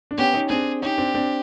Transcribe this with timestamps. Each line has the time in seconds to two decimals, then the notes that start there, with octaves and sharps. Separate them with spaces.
0.11 D4
0.18 B3 C#4 G4
0.33 C#4 D#4
0.49 C4 D4 G#4
0.82 C#4 D#4 G4
0.98 C4 D4
1.15 C4 D4